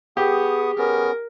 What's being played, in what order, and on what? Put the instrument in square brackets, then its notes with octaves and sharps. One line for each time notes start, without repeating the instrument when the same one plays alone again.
[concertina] B3 C#6 D#6 [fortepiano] G4 [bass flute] G#4
[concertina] B3 C#4 [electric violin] A#4